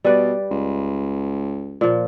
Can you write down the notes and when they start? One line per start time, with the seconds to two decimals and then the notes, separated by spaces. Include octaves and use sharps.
0.04 B2 G3 B4 D5
0.50 C#2
1.81 A#2 F3